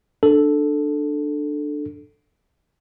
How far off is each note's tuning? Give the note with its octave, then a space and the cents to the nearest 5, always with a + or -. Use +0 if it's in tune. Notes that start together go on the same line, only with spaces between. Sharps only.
D4 +15 A4 +0